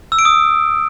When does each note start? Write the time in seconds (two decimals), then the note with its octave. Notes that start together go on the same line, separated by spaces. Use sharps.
0.12 E6
0.19 D7
0.25 D#6